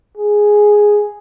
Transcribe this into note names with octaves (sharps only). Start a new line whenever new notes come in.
G#4